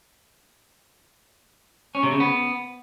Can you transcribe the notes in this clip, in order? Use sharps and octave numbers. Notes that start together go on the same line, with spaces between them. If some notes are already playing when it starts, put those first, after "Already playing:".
C#4
C3
C#3
B3